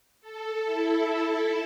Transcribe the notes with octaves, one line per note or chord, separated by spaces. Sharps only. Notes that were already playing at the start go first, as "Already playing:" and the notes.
A4
E4